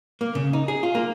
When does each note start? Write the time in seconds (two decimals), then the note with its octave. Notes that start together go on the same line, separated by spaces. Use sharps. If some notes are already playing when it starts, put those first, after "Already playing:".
0.21 A#3
0.35 C#3
0.53 D#4
0.68 G#4
0.83 F4
0.95 A#3